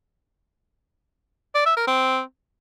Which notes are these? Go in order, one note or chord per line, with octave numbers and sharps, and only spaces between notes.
D5
E5
A#4
C4